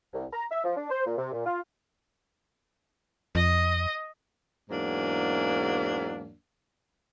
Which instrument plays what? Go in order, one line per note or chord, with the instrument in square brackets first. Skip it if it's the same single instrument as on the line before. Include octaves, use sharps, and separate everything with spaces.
[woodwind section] C2
A#5
E5
F3
D4
C5
A#2
C3
A#2
F4
[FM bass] F2 [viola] D#5
[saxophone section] E2 G#2 F#3 A#3 D4